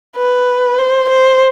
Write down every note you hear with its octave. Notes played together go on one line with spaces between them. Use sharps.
B4
C5
C5